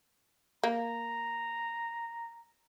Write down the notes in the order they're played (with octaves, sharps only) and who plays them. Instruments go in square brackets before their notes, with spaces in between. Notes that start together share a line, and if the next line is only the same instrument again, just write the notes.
[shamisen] A#3 [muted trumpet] A#5